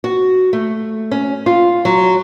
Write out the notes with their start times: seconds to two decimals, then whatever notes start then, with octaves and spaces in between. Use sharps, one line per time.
0.04 F#4
0.53 A3
1.12 C#4
1.46 F4
1.85 F#3